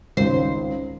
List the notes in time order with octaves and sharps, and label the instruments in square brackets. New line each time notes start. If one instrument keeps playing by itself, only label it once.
[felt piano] G#1 C#2 [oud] C5